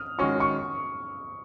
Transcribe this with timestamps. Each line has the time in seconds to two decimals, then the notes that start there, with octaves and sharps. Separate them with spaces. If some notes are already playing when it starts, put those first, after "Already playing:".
Already playing: D#6 F6
0.18 D#3 G#3 C#4 F#4 C#6
0.40 C#6